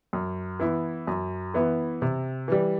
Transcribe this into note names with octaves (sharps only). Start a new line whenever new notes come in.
F#2
E3 B3 E4
F#2
E3 B3 E4
C3
E3 G3